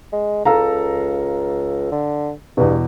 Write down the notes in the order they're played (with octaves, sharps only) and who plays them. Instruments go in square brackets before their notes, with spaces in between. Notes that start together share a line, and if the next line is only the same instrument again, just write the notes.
[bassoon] G#3
[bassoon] C#2 [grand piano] A4 F5 A#5
[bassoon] D3
[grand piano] E2 B2 [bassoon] G2